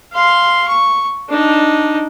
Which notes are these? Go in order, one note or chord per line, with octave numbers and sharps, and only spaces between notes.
F5 C6
C#6
D4 D#4